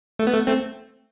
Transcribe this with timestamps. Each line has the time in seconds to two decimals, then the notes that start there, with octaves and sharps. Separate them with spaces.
0.19 A3
0.27 B3
0.34 A3
0.47 A3 C4